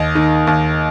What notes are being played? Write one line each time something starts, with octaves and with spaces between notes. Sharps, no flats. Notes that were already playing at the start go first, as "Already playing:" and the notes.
Already playing: D#2 D#5
D#3
D#2